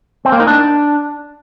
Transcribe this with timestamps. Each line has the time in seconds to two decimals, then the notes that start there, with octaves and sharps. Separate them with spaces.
0.25 C4
0.32 A#3
0.40 D#4
0.47 D4